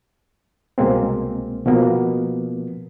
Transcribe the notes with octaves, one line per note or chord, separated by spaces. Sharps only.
C2 B2 G#3 A#3 C4
B2 F3 A#3 B3